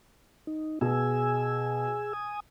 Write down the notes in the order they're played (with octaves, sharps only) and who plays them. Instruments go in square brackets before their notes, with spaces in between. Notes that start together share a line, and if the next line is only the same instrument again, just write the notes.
[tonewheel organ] D#4
[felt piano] B2 [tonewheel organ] G#4 G#5 E6
[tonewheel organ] G#5 D#6